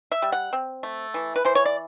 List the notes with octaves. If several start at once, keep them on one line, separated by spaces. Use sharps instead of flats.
E5
G3
F#5
C4
A3
E3
B4
E3 C5
C#5
D5